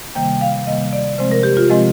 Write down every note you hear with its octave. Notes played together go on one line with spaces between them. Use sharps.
C3 D#3 G3 A#3 G5
F5
C3 D#3 G3 A#3 D#5
D5
C3 F3 G#3 C4 C5
A#4
G4
F4
C3 F3 G#3 C4 D#5